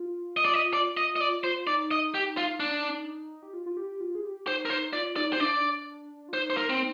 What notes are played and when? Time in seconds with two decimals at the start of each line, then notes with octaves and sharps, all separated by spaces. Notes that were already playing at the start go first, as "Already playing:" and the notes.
Already playing: F4
0.37 D#5
0.45 D5
0.54 D#5
0.73 D5
0.97 D#5
1.16 D#5
1.21 D5
1.44 C5
1.67 D#4 D5
1.91 D#5
2.14 G4
2.37 F4
2.60 D4
3.43 G4
3.54 F4
3.66 F4
3.77 G4
4.01 F4
4.15 G#4
4.24 G4
4.47 D#4 C5
4.65 A#4
4.70 D#4 C5
4.93 F4 D5
5.16 D#4 D5
5.33 C5
5.37 D#4
5.40 D4 D5
6.29 F4
6.34 D#4 C5
6.50 C5
6.57 A#4
6.70 C4